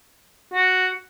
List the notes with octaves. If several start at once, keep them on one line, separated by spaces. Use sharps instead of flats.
F#4